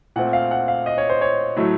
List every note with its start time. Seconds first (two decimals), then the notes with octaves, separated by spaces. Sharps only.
0.16 A#2 A3 C4 F#5
0.33 F5
0.51 F#5
0.68 F5
0.86 D#5
0.98 C#5
1.10 C5
1.21 C#5
1.56 A2 F#3 A3